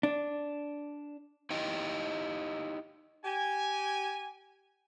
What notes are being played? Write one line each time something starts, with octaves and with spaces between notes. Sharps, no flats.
D4
D#4 E4 G4 D#5 G5
G4 G#5